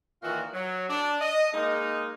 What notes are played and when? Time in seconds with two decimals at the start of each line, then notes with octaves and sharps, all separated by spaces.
0.22 A#2 D#3 E3 F4 F#4
0.54 F#3
0.88 D4
1.20 D#5
1.53 G#3 A#3 D#4